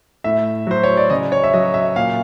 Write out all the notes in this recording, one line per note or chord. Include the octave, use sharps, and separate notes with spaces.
A2 E5
F#3 C5
C#5
D5
C#3 D#5
C#5
E5
F#3 D#5
E5
A#2 F5